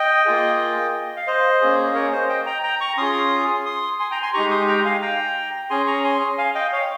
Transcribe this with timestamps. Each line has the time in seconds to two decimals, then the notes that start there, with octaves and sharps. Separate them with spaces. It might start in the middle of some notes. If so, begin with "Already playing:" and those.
Already playing: D#5 G5
0.25 A#3 F4 G#4
1.16 F5
1.27 C5 D#5
1.61 A#3 C#4 G#4
1.95 A#4 C#5
2.12 C5 D#5
2.29 D#5 G5
2.46 G5 A#5
2.63 G5 A#5
2.81 A#5 C#6
2.97 C#4 F4 G#4 C6 D#6
3.66 C6 D#6
4.00 G#5 C6
4.11 G5 A#5
4.22 G#5 C6
4.34 G#3 D#4 G4 A#5 C#6
4.51 C6 D#6
4.68 G5 A#5
4.78 A#5
4.85 F5 G#5
5.02 G5 A#5
5.70 C#4 G#4 G#5 C6
5.87 A#5 C#6
6.04 G#5 C6
6.38 F5 G#5
6.55 D#5 G5
6.72 C#5 F5